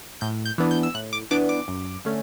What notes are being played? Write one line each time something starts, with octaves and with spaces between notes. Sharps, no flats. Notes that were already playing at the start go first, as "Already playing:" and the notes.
A2 G6
G6
E3 B3 D4
G6
E6
A2 F#6
D6
E3 B3 D4 D6
D6
F#2
D3 A3 C#4